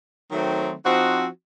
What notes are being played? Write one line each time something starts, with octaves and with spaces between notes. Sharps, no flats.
D#3 F#3 A3 C4
F3 C4 D#4 F#4